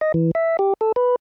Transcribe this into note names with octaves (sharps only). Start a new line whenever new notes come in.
D#5
E3
E5
G4
A4
B4